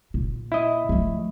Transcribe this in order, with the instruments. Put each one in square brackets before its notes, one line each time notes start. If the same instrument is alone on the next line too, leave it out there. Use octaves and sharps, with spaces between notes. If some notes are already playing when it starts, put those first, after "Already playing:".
[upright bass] A#2
[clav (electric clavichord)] E4 D#5
[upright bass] F3 A3